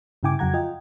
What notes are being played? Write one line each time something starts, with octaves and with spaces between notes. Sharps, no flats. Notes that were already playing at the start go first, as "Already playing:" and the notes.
G2 C#3 E4 G5 G#5 D6
F2 C#3 F#3 F#5 A#5 G#6
F4 D#5 G5